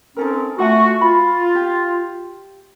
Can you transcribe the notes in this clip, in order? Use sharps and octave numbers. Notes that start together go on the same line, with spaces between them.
C4 C#4 D#4 A4 A#4
A3 F4 F#4 F#5 G#5
F4 B5
G4